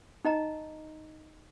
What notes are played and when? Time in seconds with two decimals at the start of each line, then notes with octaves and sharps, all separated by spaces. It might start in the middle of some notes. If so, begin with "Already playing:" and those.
0.25 D#4 D#5 A#5